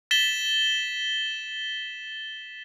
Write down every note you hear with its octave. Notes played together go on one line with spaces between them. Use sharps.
A6 B6 E7 G7